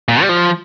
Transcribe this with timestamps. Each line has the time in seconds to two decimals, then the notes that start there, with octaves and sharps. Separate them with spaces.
0.08 A#2
0.22 G3
0.29 F3